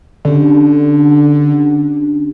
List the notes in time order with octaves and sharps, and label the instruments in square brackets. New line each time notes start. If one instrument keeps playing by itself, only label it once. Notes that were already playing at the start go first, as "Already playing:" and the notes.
[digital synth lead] D3 [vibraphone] C#4 D4 G4